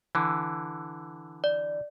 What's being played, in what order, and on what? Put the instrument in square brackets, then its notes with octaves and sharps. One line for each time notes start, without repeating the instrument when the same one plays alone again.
[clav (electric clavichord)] D3 E3
[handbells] D5